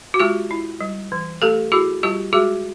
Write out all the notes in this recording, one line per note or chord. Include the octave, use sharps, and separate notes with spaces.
F#4
G#3 F4 G4
E4
G3
E3
A3 G4 A4
E4 F#4 G#4
G3 F4 G4
G#3 F#4 G#4